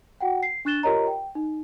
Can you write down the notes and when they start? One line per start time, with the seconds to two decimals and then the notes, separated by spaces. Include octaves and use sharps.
0.21 F#4 F#5 G5
0.43 C7
0.65 D4 C#6 F#6 A6 E7 G7
0.83 F4 G4 A#4 C#5 D#5 A#5
1.07 G5
1.35 D#4